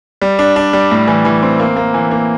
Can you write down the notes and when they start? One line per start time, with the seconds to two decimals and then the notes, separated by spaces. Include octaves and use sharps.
0.22 G3
0.39 D4
0.56 D4
0.73 G3
0.91 A2
1.08 E3
1.25 E3
1.42 C4
1.59 A#3
1.77 A#3
1.94 E3
2.11 A#3